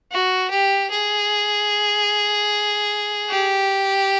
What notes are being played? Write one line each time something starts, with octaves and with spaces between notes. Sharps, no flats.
F#4
G4
G#4
G4